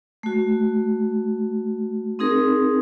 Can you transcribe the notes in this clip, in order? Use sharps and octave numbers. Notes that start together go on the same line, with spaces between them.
A3 F#4
C4 D#4 G#4 A#4